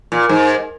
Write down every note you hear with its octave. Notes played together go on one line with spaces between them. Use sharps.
A#2
G#2